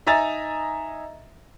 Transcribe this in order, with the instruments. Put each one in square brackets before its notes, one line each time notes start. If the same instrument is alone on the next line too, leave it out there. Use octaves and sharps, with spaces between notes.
[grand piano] D#4 D#5 E5 G#5 A#5 A6